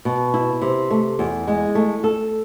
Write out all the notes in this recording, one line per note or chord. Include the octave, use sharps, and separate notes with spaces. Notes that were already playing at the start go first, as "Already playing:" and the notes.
B2
E4
C3
A3
E2
G#3
A3
A4